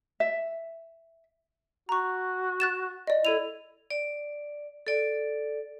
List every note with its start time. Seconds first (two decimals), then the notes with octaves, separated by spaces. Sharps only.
0.20 E5
1.89 F#4 A#5 C#6
2.60 F#6 A6 E7
3.07 D5 D#5
3.25 E4 A4 D#7 F7
3.91 D5
4.87 A4 D5